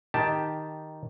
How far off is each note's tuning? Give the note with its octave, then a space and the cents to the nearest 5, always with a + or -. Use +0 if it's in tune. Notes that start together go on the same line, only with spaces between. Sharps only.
D#3 +0 G4 +0 A5 +0